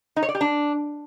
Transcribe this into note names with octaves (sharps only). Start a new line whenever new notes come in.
D#4
C#5
D5
G4
D4